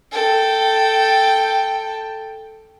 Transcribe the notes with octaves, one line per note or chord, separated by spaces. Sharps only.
A4 G5